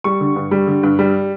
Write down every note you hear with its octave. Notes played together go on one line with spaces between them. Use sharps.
G3 C#6
D3
G2
G3
D3
G2
G3